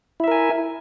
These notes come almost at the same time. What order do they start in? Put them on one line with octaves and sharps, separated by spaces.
E4 E5 A#4 G#5